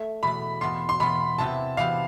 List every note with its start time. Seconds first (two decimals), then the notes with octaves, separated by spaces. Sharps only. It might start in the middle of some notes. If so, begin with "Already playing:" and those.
Already playing: A3
0.23 E2 B2 A3 B5
0.61 E2 B2 B3 F4 C6
0.89 C6
1.00 E2 B2 B3 F4 B5
1.38 C3 E3 B3 E4 G4 A5
1.77 C3 E3 B3 E4 G4 F5